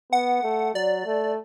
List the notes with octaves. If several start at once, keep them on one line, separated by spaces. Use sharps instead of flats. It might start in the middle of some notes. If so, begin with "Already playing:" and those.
B3 F#5
A3
F#3 D5
A3